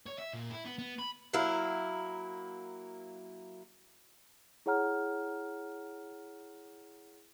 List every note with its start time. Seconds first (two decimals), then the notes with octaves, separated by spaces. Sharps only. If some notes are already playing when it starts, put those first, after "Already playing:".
0.06 C#5
0.18 E5
0.33 A#2
0.50 E4
0.65 B3
0.79 B3
0.99 B5
1.33 F#3 A#3 E4 F5
4.66 E4 G#4 C#5 F#5 A#5 F6